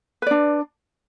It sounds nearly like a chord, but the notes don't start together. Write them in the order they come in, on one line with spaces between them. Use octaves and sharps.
B4 D5 D4